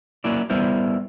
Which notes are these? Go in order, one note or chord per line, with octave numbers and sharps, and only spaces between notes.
F#3 A#3 C#4 E4 D5
G3 B3 E4 A#4 C5